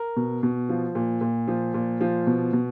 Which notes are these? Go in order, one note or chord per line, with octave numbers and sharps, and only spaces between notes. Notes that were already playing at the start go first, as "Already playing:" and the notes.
Already playing: A#4
B2
B2
F3
A#2
A#2
F3
A#2
F3
B2
B2